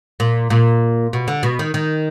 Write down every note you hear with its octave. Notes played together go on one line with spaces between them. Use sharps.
A#2
A#2
B2
D3
B2
D#3
D#3